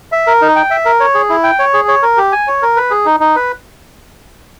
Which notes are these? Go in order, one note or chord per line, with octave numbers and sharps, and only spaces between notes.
E5
A#4
D#4
G5
E5
A#4
C#5
G#4
E4
G5
C#5
G#4
C#5
A#4
G4
G#5
C#5
A#4
B4
G#4
D#4
D#4
B4